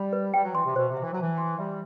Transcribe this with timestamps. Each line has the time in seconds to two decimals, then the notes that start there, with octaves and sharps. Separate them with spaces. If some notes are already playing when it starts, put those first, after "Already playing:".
Already playing: G3 B5
0.13 B4
0.34 G3 G5
0.44 F#3
0.55 E3 C6
0.65 C3
0.76 B2 C5
0.89 C3
0.97 E5
1.03 E3
1.12 F#3
1.17 E3 A5
1.38 C6
1.58 G3 E5